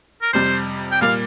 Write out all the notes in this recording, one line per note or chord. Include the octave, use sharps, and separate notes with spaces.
A#4
F2 C3 G3 C5
G5
A#2 G3 A#3 F5